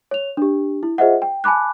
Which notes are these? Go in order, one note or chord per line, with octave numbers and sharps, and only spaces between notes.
C#5 F7
D4 G4
E4
F4 G#4 C5 D#5 E5 F#5
G5
G#5 A5 B5 D6 F#6